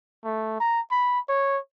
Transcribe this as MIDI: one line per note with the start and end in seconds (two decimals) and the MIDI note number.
0.24 0.58 57
0.60 0.81 82
0.91 1.20 83
1.29 1.58 73